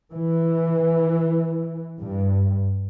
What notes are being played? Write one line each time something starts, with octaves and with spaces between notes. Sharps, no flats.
E3
G2